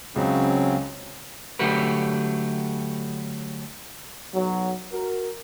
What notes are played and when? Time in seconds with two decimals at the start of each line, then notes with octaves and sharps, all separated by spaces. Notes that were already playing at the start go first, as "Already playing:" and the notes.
0.16 C#2 C#3 F#3 C4 C#4
1.59 D3 F#3 A3 F#4 G4 B4
4.34 B1 F#3
4.92 F#4 A#4